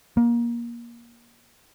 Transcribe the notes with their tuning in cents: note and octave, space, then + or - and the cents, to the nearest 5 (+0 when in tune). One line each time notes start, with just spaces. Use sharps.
A#3 +20